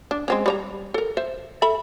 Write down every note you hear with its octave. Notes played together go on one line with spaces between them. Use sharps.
D4
G#3 C4 C#4
G3 C#5 A#5
A4 A#4
C5 E5
A4 E5 B5